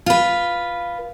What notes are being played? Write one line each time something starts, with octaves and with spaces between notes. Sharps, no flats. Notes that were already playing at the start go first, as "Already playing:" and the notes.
F4 B4